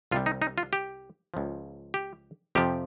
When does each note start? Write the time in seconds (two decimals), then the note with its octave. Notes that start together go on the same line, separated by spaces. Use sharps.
0.11 C2 C3 G3 F4
0.26 D#4
0.42 D#4
0.58 F4
0.73 G4
1.34 C#2 C#3 F3
1.94 G4
2.55 F2 C3 F3 G4